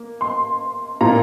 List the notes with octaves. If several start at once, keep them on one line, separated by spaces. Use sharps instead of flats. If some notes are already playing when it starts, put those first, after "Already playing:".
Already playing: A#3
C6
A#2 A#3 A#5